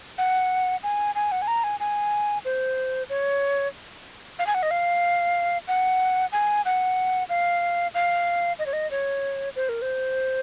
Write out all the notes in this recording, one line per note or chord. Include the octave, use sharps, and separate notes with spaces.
F#5
G#5
G#5
F#5
G#5
A#5
G#5
G#5
C5
C#5
F5
G#5
F#5
D#5
F5
F#5
G#5
F#5
F5
F5
D#5
C#5
D#5
C#5
C5
A#4
C5